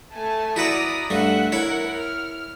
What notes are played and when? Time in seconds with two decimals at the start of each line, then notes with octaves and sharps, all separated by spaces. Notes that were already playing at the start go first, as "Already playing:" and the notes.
0.13 A3 G#5 A5
0.56 E4 F#4 B4 D5 A#5 D#6
1.10 G2 A3 E5 F#5
1.52 E4 A#4 C#5 F#5
1.90 F6